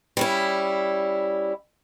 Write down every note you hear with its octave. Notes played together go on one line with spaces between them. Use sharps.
G3 C#4 E4